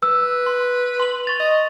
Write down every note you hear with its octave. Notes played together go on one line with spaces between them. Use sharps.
B4 E6
C6
C6 F#7
C#6 A6 F7
D#5